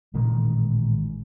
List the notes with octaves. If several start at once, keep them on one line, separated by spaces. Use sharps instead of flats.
A1 A#2 D#3 G#3